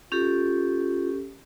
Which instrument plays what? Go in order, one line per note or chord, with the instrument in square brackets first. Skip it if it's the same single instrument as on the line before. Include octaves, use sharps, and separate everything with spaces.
[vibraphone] C#4 G4 A4 [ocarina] F4